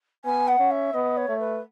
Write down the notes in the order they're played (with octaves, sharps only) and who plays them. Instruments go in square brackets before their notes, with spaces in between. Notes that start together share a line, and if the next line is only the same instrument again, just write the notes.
[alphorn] B3 [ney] G#5
[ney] F#5
[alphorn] C#4
[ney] E5
[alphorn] B3 [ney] D#5
[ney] C#5
[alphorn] A3
[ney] B4